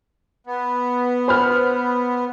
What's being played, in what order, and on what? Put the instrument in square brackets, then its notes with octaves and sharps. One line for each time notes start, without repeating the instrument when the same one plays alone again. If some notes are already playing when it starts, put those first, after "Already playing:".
[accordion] B3
[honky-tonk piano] C5 B5 F6